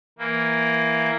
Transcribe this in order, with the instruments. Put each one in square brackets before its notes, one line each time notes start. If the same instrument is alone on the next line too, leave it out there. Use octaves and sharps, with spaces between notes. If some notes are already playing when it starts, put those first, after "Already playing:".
[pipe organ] E3 A#3